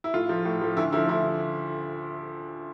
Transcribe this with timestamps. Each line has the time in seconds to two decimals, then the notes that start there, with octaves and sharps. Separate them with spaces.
0.04 E4
0.14 A2 F4
0.29 F3 A3
0.45 A2
0.61 F3 A3
0.77 D2 E4
0.92 D3 F3 A3 E4
1.08 D2 E4